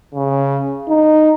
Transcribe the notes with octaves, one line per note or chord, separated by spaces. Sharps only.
C#3
D#4